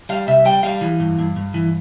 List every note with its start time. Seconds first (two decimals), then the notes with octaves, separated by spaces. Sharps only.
0.09 G3 F5
0.27 C2 E5
0.45 G3 G5
0.63 G3 F5
0.81 E3
1.00 G2
1.19 G2
1.36 G2
1.54 E3